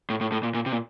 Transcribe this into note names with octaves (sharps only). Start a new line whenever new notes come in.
A2
A2
A2
A#2
A#2
C3
A#2